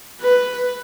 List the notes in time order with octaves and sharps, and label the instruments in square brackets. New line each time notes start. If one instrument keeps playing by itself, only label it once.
[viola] B4